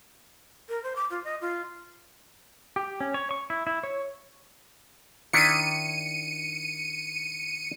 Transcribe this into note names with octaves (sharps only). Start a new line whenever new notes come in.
A#4
C5
D6
F4
D#5
F4
G4
C#4
C#5
C#6
E4
E4
C#5
D#3 D4 E4 C#7 D#7